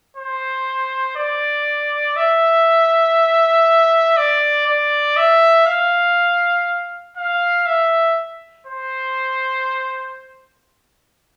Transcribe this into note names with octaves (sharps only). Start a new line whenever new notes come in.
C5
D5
E5
D5
D5
E5
F5
F5
E5
C5